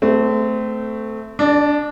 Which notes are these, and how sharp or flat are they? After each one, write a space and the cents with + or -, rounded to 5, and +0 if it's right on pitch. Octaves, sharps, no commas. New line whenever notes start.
A3 +0 C4 -25
D4 -10 D5 +30